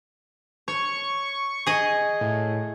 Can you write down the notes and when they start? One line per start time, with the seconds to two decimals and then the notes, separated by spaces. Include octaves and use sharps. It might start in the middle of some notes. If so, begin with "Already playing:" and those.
0.68 C#5 C#6
1.66 G#4 D#5
2.21 A2